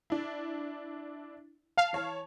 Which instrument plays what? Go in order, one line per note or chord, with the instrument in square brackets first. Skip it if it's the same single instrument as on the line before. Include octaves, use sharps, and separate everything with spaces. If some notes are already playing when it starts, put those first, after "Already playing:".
[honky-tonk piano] D4 E4
[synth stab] F5 [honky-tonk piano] A5
[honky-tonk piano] E3 C#5 A5